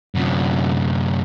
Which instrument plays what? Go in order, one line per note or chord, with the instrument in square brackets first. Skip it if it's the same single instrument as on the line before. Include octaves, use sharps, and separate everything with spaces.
[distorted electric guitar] F#2 C3